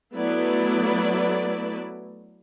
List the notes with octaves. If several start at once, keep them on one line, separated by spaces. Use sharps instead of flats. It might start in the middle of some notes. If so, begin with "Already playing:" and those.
F#3 A3 B3 E4 B4 D5